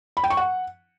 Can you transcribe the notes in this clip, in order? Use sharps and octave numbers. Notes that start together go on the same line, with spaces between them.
B5
G5
C#6
F#5